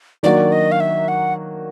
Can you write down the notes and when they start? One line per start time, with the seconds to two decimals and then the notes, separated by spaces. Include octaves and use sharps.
0.23 D#3 F#3 A#3 D4 F#4 D5
0.52 D#5
0.72 F5
0.80 E5
1.08 F#5